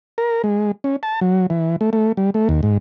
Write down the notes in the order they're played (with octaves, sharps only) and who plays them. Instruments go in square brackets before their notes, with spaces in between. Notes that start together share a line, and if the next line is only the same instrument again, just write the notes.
[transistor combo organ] A#4
G#3
C#4
A5
F#3
E3
A3
A3
G3
A3
D#2
G#2